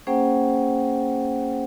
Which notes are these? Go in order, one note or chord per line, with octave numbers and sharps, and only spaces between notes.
A#3 C#4 G#4 C5 F#5 G5